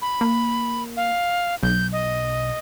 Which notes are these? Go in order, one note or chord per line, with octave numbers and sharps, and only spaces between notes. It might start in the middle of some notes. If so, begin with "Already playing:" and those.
B5
A#3
F5
B1 G6
D#5